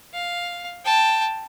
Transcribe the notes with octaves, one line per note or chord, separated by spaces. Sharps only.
F5
G5 A5